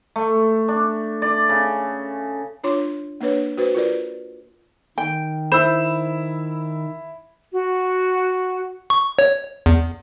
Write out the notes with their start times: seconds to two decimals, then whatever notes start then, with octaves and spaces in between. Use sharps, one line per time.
0.16 A3
0.68 D4
1.22 D5
1.49 C#3
2.64 D4 F4 C#5 C6 D6
3.21 A#3 D4 B4 C#5
3.58 F#4 B4 C5
3.75 F4 A#4 B4 D5
4.98 D#3 G5
5.52 E4 C5 B5 E6 E7
7.52 F#4
8.90 C#6
9.19 C#5
9.66 E2